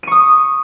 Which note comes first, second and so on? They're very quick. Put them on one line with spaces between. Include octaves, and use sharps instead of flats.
D#7 C#6 D#6